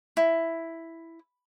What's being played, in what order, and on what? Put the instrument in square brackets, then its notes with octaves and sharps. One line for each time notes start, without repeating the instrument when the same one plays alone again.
[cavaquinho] E4